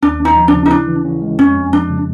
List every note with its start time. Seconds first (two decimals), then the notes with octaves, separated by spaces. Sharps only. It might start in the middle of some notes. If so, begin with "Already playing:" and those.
0.02 D#2 D4
0.20 D#2
0.25 D#4
0.36 F3
0.48 D4
0.54 C#3
0.66 D#4
0.70 D4 E4
0.87 E3
1.05 C#4
1.22 G#3
1.38 F2 C#4
1.56 F2
1.73 F3 D4
1.90 C#3